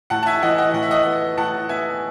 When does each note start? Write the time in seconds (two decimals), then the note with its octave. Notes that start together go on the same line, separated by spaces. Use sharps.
0.10 A2 F#5 A5
0.23 A5
0.26 E5 G#5
0.42 E3 D#5 F#5
0.58 D#5 F#5
0.74 A2 F#5
0.83 E5
0.91 D#5 F#5
1.06 B3
1.37 A2 F#5 A5
1.69 B3 E5 G#5